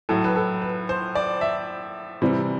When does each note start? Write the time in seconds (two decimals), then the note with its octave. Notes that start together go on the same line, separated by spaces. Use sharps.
0.09 A2 F#3 A4
0.24 B4
0.36 A4
0.62 B4
0.89 C5
1.15 D5
1.41 E5
2.22 C3 E3 G3